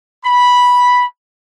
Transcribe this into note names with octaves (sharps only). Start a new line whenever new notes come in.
B5